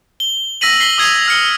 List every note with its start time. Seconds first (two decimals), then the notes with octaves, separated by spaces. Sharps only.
0.20 G7
0.61 E6 A#6 B6 D#7 F#7
0.80 B6 C7 G7
0.98 D#6 E6 G#6 C7 D#7
1.28 F6 C#7